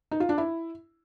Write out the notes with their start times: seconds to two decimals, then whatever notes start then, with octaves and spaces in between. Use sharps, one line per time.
0.11 D#4
0.20 F4
0.29 D4
0.38 E4